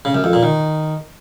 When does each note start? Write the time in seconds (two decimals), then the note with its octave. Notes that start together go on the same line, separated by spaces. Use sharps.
0.05 C#3
0.15 F#2
0.24 F2
0.33 A#2
0.43 D#3